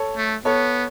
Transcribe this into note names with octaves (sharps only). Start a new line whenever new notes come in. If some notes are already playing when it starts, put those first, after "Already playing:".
Already playing: A4 C#5
A3
B3 A4 C#5